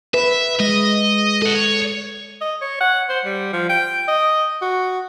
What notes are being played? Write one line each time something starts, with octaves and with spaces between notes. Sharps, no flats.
B4 E5
G#3 D#5
A4 D#5 F#5
C#5
D#5
C#5
F#5
C5
G3
F3
G5
D#5
F#4